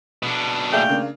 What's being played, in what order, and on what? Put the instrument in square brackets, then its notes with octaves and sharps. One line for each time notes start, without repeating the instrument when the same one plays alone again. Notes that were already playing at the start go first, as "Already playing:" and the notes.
[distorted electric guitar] B2 D4
[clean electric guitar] D#2 A3 F5 [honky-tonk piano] G#4 D5 E5 [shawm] G5
[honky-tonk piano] C#3 A#3 D4